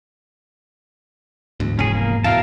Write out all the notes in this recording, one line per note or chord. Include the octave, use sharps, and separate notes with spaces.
D2 G#2 E3 B3
F1 E2 C#4 G#4
A#3
E2 B2 A#4 E5 F5 A5